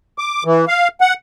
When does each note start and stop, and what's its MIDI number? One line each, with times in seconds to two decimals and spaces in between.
0.18 0.43 86
0.45 0.65 52
0.68 0.88 77
1.01 1.14 78